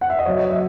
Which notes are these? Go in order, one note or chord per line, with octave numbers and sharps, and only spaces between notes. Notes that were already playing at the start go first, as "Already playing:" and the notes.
F#5
E5
D#5
F#3 C#5
D#5
E5